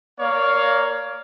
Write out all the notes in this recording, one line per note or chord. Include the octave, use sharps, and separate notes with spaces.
A#3 C#5 D5 F5